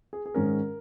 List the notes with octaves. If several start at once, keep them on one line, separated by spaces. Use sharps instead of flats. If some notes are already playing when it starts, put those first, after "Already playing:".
G#4
G#4
G#2 D#3 G#3 C#4 A#4